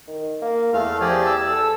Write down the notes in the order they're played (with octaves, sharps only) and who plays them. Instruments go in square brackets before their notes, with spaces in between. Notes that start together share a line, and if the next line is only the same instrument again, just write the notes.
[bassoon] D#3
A#3
[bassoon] E2 [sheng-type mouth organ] A3 F5
[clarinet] F3 [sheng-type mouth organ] G4 G#4 D5
[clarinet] E6
[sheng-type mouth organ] A4